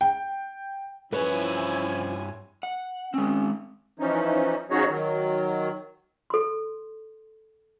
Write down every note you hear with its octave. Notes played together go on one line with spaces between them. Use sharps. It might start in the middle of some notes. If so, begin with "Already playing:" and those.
G5
G2 F3 C#4 E4 B4 C#5 G#5
F#5
G#3 C4 C#4
E3 F3 C#4 D#4
F3 C#4 D#4 F#4 G#4 C#5
D#3 F#3
A4 C6